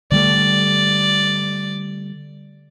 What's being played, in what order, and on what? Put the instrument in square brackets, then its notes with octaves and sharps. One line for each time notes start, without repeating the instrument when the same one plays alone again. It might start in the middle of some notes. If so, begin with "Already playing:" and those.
[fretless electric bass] D3 G3 A3 [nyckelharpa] D5